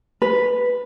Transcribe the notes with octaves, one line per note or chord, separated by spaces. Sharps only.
B4